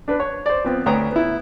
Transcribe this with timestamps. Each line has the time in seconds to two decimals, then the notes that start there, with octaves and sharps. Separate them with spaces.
0.08 D4 B4
0.20 C#5
0.46 C5 D5
0.64 F3 B3 C4
0.86 D2 B4 C#5 G5 A#5 D#6
1.12 B3 E4